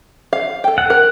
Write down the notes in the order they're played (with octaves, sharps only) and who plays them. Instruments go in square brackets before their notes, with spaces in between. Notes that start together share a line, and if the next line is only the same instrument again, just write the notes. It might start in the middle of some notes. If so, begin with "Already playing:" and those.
[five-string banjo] F5
A4 G5
[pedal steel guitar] F#5
[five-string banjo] A#4